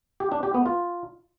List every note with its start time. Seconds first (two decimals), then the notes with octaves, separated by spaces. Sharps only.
0.20 G4
0.32 D4
0.43 G4
0.54 B3
0.66 F4